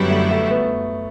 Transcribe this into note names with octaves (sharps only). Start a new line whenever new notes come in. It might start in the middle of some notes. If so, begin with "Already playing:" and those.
Already playing: F#2 D3 F#3 G3 B3 E4
A3
A3
B3